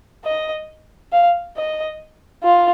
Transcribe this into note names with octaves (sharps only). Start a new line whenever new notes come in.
D#5
F5
D#5
F4